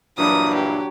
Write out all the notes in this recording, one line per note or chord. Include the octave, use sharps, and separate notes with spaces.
G2 A#2 E3 F#3 D4 D#6
G4